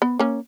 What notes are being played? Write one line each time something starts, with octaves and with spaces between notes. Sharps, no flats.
B3
A#3 C#4